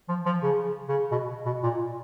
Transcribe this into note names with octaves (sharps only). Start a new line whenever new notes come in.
F3
F3
C#3
C#3
B2
B2
A#2